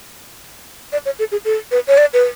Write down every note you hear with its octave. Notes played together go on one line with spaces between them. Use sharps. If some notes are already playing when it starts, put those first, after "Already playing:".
D5
C#5
A4
G#4
A4
B4
C#5
D5
B4